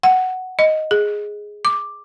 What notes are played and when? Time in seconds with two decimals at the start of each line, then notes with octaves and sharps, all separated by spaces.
0.03 F#5
0.59 D#5
0.91 G#4
1.65 D6